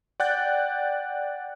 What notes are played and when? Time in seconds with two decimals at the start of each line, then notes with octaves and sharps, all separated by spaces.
0.20 D5 F#5 G5 F#6 G6 A6